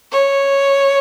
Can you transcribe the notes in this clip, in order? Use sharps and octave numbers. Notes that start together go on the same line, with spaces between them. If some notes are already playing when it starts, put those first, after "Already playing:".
C#5